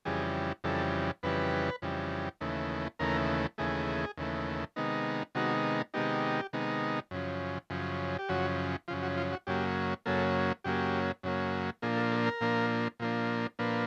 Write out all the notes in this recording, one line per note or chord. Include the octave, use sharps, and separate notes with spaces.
F2 C#3 E3 G3 G#4
F2 C#3 E3 G3 A4
F2 C#3 E3 G3 B4
F2 C#3 E3 G3
D#2 C#3 E3 A3
D#2 C#3 E3 A3 A#4
D#2 C#3 E3 A3 G#4
D#2 C#3 E3 A3
C3 D#3 G#3 B3 D#4
C3 D#3 G#3 B3 D#4 F#4
C3 D#3 G#3 B3 D#4 G4
C3 D#3 G#3 B3 D#4
F#2 C#3 F3
F#2 C#3 F3
G4
F#2 C#3 F3 F#4
F#2 C#3 F3 F4
F#4
F4
F#4
F#2 C#3 F#3 A#3 G4
F#2 C#3 F#3 A#3 A4
F#2 C#3 F#3 A#3 G4
F#2 C#3 F#3 A#3
A#2 F3 A#3 D4 G#4
A4
A4
A#4
A#2 F3 A#3 D4
A#2 F3 A#3 D4
A#2 F3 A#3 D4 B4